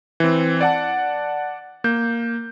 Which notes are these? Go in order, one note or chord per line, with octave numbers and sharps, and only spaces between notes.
E3 C4
D5 F#5 A5
A#3 G6